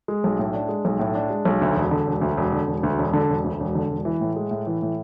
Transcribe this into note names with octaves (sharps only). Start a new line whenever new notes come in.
G#3
B1
A2
D4
G#3
B1
A2
D4
G#3
B1
D2
E1
D3
E1
D2
E1
D3
E1
D2
E1
D3
E1
D2
E1
D3
E1
E3
A2
G#3
A2
E3
A2